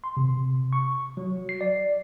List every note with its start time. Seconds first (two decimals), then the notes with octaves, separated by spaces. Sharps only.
0.04 C6
0.17 C3
0.73 C#6
1.17 F#3
1.49 C7
1.61 D5